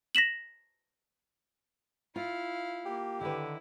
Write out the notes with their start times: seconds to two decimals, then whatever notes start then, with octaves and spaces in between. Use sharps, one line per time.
0.15 A#6 B6 E7 F#7
2.16 E4 F4 F5
2.85 A#3 G4
3.21 D3 D#3 E4 B4